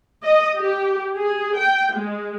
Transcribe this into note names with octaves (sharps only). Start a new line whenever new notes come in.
D#5
G4
G#4
G5
G#3